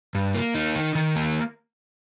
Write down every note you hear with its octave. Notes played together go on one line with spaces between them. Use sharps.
G2
A#3
D#4
D#3
D#3
A#3